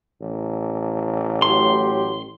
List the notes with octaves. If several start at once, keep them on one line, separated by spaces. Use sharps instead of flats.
A1
A2 F#3 G4 C6